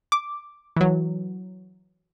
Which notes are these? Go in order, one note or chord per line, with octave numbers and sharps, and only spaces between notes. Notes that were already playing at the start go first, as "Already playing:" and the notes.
D6
E3 F#3